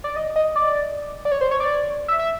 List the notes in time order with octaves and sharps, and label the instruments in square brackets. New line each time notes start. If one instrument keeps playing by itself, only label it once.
[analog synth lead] D5
D#5
D#5
D5
D5
C#5
C5
C#5
D5
E5
E5